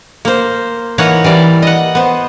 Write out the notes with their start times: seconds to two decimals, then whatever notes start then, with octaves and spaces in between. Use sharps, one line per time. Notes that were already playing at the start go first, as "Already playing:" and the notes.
0.25 A#3 C5
0.98 E3 A#3 D#4 C#5 F#5
1.24 E3 G3 D5
1.62 D#5 F#5
1.95 B3 C5